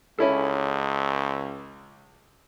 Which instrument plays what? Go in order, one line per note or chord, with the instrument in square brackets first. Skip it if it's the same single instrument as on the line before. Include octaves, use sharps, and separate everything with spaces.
[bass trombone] C#2 [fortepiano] C#4 E4 A4